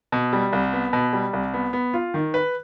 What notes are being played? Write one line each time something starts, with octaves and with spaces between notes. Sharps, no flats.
B2
G3
C2
B3
B2
G3
C2
B3
B3
F4
D#3
B4